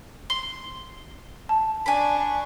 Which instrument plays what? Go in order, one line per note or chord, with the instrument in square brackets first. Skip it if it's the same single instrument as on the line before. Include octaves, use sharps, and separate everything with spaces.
[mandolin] C6 [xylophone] G7
[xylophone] A5
[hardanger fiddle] D4 C#6 [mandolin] G#5 B5